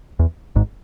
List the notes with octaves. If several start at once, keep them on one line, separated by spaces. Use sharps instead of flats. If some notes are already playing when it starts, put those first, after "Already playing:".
E2
G#1 G#2